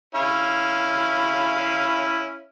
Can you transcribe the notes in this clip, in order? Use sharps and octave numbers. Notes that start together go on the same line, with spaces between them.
C#4 E4 F5